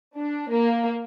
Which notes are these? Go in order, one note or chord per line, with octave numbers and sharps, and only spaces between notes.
D4
A#3